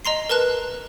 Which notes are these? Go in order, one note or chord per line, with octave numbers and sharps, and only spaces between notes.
D#5 A#5 C6 C7
A#4 B4 A5 F#6